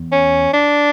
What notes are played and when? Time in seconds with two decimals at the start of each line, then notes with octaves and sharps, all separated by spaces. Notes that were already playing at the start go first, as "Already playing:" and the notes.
Already playing: E2
0.12 C#4
0.53 D4